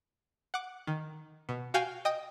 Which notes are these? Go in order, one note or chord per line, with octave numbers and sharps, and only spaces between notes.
F#5 D6
D#3
B2
F#4 F5 G5 G#5
D#5 G5 D#6